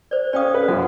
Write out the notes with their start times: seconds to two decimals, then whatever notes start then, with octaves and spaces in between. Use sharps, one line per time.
0.11 C5 D5
0.33 C#4 D5 F5 G5 D#6
0.54 B4
0.68 F#2 F3 F#5